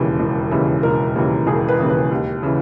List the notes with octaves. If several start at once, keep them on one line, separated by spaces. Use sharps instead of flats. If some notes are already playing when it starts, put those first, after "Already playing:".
Already playing: E1 D#2 C#3 E3
E1
D#2 C#3 E3
E1 A#4
D#2 C#3 E3
E1 G#4
B4
D#2 C#3 E3
B4
D#2
C#3 E3